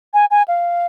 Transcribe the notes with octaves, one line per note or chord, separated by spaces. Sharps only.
G#5
G#5
F5